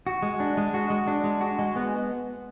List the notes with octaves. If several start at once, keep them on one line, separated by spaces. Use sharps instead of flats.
F#4
G#3
D4
G#3
F#4
G#3
D4
G#3
F#4
G#3
B3